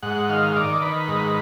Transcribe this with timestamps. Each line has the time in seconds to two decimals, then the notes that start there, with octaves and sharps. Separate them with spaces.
0.03 G#2 F#5
0.29 D#3 F5
0.56 D#3 D5
0.82 D#3 B4
1.08 G#2